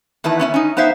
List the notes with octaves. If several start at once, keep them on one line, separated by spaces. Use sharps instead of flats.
E2 D#3 E4 B4 A5
B3 C#4 E5
C#4 D#4
B3 D#4 C5 E5 F5